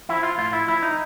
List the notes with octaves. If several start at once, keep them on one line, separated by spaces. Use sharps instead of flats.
F3 E4
F4
A2 F4
E4
F3 E4
D#4